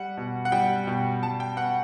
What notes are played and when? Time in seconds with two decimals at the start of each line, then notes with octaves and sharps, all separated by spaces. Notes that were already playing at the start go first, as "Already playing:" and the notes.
Already playing: G3 F#5
0.17 B2
0.45 F#5
0.52 G3 G5
0.87 B2
1.22 G3 A5
1.40 G5
1.56 B3 F#5